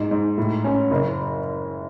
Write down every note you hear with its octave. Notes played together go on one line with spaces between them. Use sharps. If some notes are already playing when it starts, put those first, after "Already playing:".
Already playing: G#2
G#2
A2
C#4
F#1